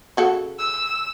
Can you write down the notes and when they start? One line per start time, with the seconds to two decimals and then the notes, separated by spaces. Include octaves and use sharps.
0.17 C#3 F#4 A4
0.59 E6